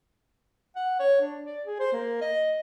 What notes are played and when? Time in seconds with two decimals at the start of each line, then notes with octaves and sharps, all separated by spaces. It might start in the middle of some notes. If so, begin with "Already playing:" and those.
0.76 F#5
0.99 C#5
1.21 D4
1.45 D5
1.65 G#4
1.79 C5
1.93 A#3
2.21 D#5